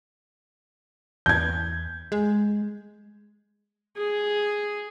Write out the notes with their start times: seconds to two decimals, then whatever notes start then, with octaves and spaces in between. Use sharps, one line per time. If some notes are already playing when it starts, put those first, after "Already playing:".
1.26 E2 G6 G#6
2.12 G#3
3.97 G#4